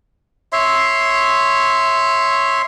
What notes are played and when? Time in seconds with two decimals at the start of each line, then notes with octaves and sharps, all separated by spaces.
0.53 C#5 E5 C6